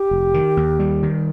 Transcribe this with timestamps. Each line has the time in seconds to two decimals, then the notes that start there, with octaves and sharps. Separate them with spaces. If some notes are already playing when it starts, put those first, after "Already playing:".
Already playing: G4
0.11 F1
0.34 D#3
0.57 D#2
0.79 G3
1.03 D#3